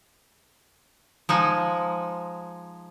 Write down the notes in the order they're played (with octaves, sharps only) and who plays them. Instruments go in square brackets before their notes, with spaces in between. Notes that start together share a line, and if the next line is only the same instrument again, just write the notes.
[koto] F3 G#3 D#4